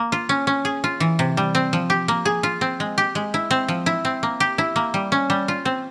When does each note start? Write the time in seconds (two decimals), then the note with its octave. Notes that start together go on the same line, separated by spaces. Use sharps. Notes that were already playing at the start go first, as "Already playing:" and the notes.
Already playing: A#3
0.12 F4
0.29 C#4
0.47 C#4
0.65 G#4
0.84 F4
1.00 E3
1.19 C3
1.37 G3
1.55 C4
1.73 F3
1.90 G4
2.08 A#3
2.25 G#4
2.43 F4
2.61 C4
2.80 G#3
2.98 G4
3.15 G#3
3.34 E4
3.51 C4
3.68 F3
3.86 E4
4.05 C4
4.23 A#3
4.40 G4
4.58 E4
4.76 A#3
4.94 G3
5.12 C#4
5.30 G3
5.48 F4
5.65 C4